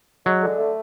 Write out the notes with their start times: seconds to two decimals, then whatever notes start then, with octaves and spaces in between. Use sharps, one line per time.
0.25 F#3 G#3
0.42 D3
0.58 A3